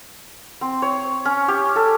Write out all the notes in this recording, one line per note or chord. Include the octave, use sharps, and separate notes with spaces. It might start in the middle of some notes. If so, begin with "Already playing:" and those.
C4
C#5
C#4
G4
A4